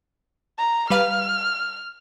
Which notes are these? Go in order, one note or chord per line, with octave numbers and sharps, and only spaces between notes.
A#5
G3 B4 F5 F6